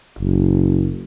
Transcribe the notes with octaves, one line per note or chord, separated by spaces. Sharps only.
F#1